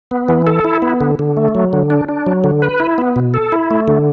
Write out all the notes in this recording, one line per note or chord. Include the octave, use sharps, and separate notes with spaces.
B3
E3
A4
E4
B3
D3
D3
A3
F#3
D3
D4
D4
F#3
D3
B4
E4
B3
B2
A4
E4
A3
D3